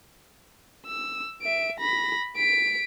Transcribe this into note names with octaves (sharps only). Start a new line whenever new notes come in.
E6
E5 D7
B5 A#6
B6 D7